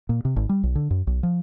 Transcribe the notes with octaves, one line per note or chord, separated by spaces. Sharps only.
A#2
C3
G#1
G3
B1
D3
F#2
B1
F3